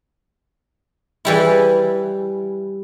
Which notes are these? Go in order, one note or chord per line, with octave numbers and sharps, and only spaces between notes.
E3 G3 E4